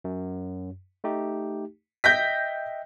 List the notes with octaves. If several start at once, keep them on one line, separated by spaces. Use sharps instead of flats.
F#2
A3 D#4 G4
D#5 E5 G5 G6 A#6 B6